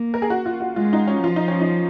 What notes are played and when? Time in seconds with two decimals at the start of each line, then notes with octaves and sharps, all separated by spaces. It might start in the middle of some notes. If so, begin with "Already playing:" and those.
Already playing: A#3
0.14 A#4
0.22 G#4
0.30 F#4
0.46 F4
0.60 F#4
0.76 G#3 F4
0.93 D#4
1.08 C#4
1.23 F3 F4
1.36 D#4
1.48 C#4
1.61 D#4